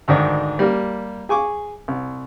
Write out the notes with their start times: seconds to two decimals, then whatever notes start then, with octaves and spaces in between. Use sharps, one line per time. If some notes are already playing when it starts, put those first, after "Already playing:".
0.08 D2 G#2 D#3 D4
0.59 G3 A#3
1.29 G#4 G#5 C#6 D6
1.88 C2